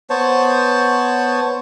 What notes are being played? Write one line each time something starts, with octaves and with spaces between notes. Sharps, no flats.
B3 C5 C#5 A5